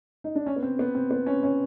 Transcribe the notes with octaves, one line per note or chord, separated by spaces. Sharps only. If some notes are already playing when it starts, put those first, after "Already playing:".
D#4
D4
C#4
B3
C4
B3
C4
B3
C#4
C#4